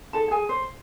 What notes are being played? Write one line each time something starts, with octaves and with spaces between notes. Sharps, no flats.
D#4 G#4 A4 A5
G#4 G#5
C5